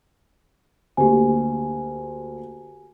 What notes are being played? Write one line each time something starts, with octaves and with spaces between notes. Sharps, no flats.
D2 A#3 G4 G#5